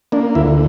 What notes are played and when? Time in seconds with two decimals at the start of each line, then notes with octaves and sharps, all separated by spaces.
0.12 A#3 D4
0.35 D2 E4